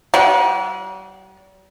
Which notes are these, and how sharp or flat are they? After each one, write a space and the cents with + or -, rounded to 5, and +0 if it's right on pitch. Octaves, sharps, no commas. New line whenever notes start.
G3 -45 F#5 -20